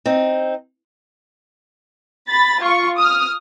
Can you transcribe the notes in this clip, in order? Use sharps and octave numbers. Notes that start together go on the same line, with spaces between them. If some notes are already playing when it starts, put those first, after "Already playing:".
C4 D#4
B5 A6
F4 C#6
D#6 F6